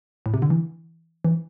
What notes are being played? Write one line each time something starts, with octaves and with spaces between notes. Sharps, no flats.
A2
C3
D3
E3
E3